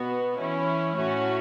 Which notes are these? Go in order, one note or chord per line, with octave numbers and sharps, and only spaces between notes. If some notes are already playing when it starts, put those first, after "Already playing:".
Already playing: B2 B3 F#4
E3 C#4 E4
A2 A3 C#4 F#4